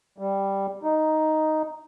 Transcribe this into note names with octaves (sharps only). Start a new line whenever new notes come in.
G3
D#4